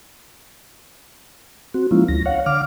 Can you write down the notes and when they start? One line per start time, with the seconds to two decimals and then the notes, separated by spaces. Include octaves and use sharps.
1.74 C4 F#4
1.91 F3 G#3 A#3 C#4 E4 F4
2.08 D2 A#6
2.26 C#5 F5 F#5
2.46 D3 F5 D6 F6